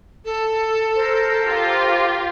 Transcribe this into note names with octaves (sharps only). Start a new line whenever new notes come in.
A4
A#4 C5
F4 G4